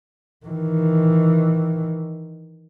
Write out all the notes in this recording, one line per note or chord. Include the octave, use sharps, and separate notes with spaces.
D#3 E3